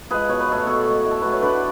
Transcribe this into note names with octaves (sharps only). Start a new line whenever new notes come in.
F3 G#3 G#4 B4
B2 C#5
B4
F#3 A3 A4 C#5
B2 A4 C#5
G#3
A2
A4
F#3 A3 B4
C#5
D3 B4 D5